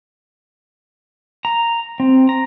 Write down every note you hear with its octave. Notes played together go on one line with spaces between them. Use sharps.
A#5
C4
A#5